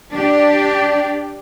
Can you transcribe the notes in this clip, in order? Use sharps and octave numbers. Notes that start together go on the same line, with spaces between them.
D4 G4